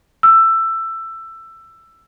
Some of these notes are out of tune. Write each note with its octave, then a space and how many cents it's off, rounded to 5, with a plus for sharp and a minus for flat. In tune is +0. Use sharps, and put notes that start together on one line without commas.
E6 +15